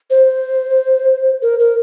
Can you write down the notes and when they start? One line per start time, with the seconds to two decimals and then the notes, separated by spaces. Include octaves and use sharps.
0.10 C5
1.42 A#4
1.59 A#4